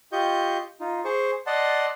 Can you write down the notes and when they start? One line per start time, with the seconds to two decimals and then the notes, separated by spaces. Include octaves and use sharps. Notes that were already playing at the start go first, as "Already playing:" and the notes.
0.12 F4 G4 D#5 C#6 G6
0.80 D#4 F4
1.05 G#4 C5 C#6
1.47 D5 D#5 F#5 A5 C6